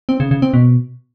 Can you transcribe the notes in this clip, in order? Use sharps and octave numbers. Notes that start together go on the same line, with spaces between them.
C4
C#3
C#3
C4
B2